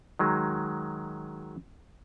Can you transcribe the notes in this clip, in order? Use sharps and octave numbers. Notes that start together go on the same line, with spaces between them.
D#3 F#3 G#3